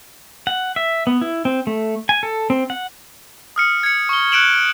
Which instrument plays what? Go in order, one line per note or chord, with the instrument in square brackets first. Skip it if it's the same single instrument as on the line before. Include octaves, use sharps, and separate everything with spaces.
[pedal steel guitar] F#5
E5
B3
E4
C4
A3
G#5
A4
C4
F#5
[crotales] D#6 F6 C#7
G#6 C#7
C#6 G7
F#6 C#7 D7 E7 F#7